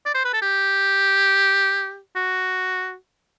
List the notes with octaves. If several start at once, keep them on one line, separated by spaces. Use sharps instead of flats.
D5
C5
B4
A4
G4
F#4